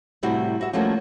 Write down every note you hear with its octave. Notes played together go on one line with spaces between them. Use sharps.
A2 C3 G3 E4 F#4
F#4 E5
F3 G3 A3 A#3 C#4 F#4